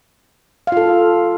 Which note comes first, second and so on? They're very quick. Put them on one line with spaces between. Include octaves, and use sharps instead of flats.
F5 F4 A4